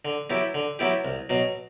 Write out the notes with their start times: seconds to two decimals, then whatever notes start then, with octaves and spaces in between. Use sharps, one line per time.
0.05 D3
0.30 F#3 B3 E4 G4
0.54 D3
0.79 F#3 B3 E4 G4
1.05 C2
1.30 B2 F#3